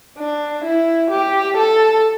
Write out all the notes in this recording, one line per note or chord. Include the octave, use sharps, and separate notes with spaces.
D4
E4
G4
A4